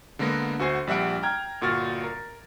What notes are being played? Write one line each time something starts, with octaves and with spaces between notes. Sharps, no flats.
D3 G#3 A#3 B3 A#6
D2 F#4 C5 G#5 C7
A#1 G3 E5 F#5 D7
G5 A#5 F6 G#6
G1 A#2 F#4 F6 A6
A#4